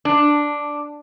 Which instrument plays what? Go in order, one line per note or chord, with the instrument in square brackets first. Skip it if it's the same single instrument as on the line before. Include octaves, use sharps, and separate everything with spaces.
[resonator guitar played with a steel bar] D4